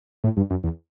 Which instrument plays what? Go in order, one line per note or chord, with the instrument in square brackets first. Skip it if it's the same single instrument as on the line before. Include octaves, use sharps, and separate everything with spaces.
[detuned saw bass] A2
G2
F#2
E2